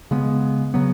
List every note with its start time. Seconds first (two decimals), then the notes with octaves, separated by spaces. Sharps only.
0.11 C#3 G#3 B3
0.74 C#3 F#3 B3